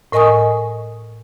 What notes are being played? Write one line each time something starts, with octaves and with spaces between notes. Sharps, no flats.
A2 A#4 D#5 G#5 C#6 D#6